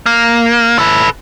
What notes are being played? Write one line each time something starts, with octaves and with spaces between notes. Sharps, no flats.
A#3
A4 B4